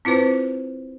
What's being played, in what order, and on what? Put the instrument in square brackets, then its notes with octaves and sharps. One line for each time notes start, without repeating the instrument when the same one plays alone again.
[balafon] C4 E4 F4 B4 C5